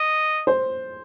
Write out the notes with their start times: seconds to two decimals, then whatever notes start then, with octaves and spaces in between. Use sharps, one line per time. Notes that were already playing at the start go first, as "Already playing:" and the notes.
Already playing: D#5
0.47 C5